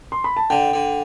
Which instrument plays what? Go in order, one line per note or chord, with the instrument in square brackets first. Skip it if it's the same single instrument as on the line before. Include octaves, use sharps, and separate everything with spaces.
[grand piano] C6
B5
A5
[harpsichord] D3 [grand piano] G5
[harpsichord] D3